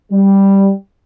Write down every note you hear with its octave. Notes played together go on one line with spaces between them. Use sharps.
G3